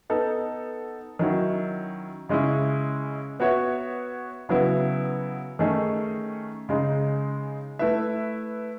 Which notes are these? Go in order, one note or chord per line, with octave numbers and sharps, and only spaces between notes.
B3 D#4 A4
D#3 F#3 C#4 E4
C#3 G#3 C#4 E4
B3 F#4 C#5 E5
C#3 F#3 B3 E4
D#3 A3 C#4 G#4 D#5
C#3 G#3 D#4
A3 E4 B4 E5